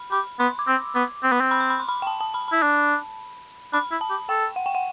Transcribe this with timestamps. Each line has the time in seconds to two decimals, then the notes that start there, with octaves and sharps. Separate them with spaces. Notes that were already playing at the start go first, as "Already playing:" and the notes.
Already playing: B5
0.12 G4 B5
0.39 B3 C6
0.59 D6
0.67 C4 E6
0.95 B3 D6
1.23 C4
1.32 B3
1.41 C4
1.51 B5
1.60 C6
1.70 B5
1.80 C6
1.89 B5
2.02 G5
2.07 A5
2.21 A5
2.34 B5
2.48 E4 B5
2.62 D4
3.73 D4 B5
3.91 E4
4.01 A5
4.10 G4
4.29 A4 G5
4.56 F#5
4.66 G5
4.75 F#5